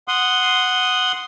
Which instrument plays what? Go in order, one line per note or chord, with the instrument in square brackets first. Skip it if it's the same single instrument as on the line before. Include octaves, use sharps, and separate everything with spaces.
[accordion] F#5 C6 D#6